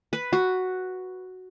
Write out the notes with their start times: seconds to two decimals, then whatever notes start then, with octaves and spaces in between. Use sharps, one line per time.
0.13 B4
0.33 F#4